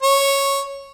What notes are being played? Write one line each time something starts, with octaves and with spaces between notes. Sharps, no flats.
C#5